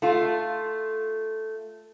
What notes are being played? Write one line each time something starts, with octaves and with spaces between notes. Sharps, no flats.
A3 F4